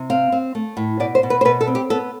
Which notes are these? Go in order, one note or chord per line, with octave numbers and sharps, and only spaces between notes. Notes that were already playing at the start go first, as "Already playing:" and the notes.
Already playing: C3
C4 F5
C4
A3
A2
B2 D5
C5
B2
B4
C5
B2 B4
A4
C4
G4
B3 A4